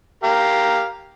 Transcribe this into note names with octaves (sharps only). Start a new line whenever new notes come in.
G4 A#4 F5